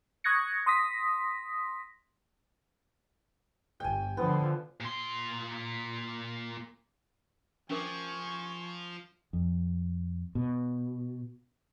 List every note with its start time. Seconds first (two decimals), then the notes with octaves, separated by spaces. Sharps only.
0.24 C#6 D#6 F#6 G#6 A#6 C#7
0.66 C6 D#6 A#6 B6
3.80 G1 G5 G#5
4.17 D3 F3 B3
4.80 A#2 C6
7.70 F3 C#4 A#4 G#5 C#6 D6
9.33 F2
10.35 B2